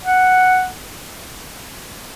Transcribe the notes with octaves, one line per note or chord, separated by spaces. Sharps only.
F#5